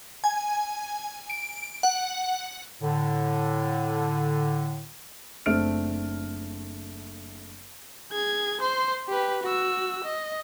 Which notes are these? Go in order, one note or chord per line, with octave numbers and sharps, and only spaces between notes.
G#5
D7
F#5
A2 D3
F#1 A3 C4 D4 F6 D7
G#4 G#6
C5 C6
G4 B4
F#4 E6
D#5